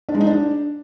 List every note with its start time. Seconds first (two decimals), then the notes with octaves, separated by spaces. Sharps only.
0.09 D4
0.15 G#3
0.21 D#4
0.27 D4